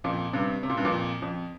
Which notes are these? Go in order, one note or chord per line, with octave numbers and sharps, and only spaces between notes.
F2 A#2
G2 C3
C3
A#2
G2
F2 A#2
F2